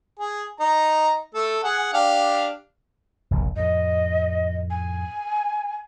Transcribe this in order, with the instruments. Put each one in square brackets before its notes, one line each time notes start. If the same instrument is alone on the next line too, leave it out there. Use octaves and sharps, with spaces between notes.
[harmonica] G#4
D#4 A#5
A3 A4
G#4 F#5
D4 G4 F5
[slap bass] F1 A#1 D#2
[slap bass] F2 A2 [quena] D#5
[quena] G#5